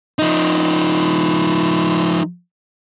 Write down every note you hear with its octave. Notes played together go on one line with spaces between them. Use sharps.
F3 D#4